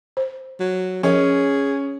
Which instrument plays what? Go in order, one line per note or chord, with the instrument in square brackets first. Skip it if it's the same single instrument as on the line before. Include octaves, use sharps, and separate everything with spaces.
[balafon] C5
[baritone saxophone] F#3
[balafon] F3 A#4 [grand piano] C#4 [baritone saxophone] G#4